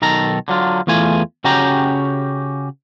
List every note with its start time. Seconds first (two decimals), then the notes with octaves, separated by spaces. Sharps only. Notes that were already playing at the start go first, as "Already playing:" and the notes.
0.02 B1 D#3 A4 A#5
0.48 D3 F#3 F4
0.87 E2 E3 A3 F4 G#5
1.44 C#3 C#4 F#4 G4 G5 A#5